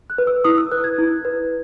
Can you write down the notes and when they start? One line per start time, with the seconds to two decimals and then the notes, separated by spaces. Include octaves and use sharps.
0.10 F#6
0.18 B4
0.27 E6
0.44 E4 D#6
0.58 E6
0.71 B4 F#6
0.84 G#6
0.98 E4
1.25 B4